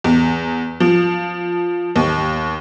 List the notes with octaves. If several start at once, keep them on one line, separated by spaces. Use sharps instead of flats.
E2
F3
D#2